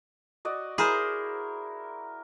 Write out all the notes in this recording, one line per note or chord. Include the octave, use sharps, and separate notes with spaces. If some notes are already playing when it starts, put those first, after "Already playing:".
F#4 D5 D#5
E4 G#4 A#4 C5